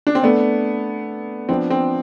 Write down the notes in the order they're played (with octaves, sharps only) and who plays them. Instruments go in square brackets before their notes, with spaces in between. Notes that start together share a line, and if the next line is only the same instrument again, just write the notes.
[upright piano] D4
C4
[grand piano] A3 D4 A4 D5 [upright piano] B3
[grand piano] F3 B3 D4 [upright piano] C4
[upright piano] C4